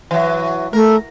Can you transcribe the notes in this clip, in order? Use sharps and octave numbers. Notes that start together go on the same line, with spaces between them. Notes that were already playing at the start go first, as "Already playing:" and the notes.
E3 F#3
A3 A#4